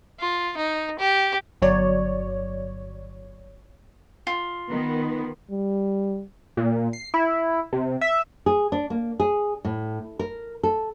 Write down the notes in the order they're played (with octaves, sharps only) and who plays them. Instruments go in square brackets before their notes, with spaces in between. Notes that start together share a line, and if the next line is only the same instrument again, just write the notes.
[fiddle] F4
D#4
G4
[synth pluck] G1 F#3 C#5 D5
[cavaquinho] F4
[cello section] D#3 B3
[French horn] G3
[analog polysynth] A#2
C7
E4
C3
E5
[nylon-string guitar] G#4
D4
A#3
G#4
A2
A#4
A4